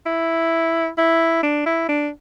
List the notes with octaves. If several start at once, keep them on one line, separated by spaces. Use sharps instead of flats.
E4
E4
D4
E4
D4